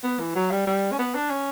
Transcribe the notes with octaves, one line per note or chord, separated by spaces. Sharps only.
B3
E3
F#3
G3
G3
C#4
B3
D4
C#4